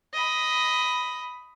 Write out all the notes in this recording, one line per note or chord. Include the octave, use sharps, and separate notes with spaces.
D#5 B5